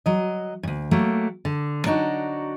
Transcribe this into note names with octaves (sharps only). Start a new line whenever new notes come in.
F#3 D#5
D2 G2
F#3 A3 A#3 G4
D3
F#3 D4 D#4 F#4